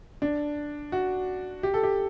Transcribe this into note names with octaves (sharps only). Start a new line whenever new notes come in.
D4
F#4
G4
A4
G4